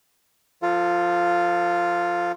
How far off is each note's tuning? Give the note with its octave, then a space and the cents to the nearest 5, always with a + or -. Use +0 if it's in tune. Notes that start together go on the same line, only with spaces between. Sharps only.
F3 +0 F4 +0 A4 +30